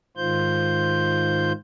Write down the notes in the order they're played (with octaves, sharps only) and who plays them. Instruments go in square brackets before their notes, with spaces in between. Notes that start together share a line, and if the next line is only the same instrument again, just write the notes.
[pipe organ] G#2 D#3 F4 C5 G6